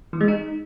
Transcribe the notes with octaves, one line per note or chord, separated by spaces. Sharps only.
E3
G#3
D#4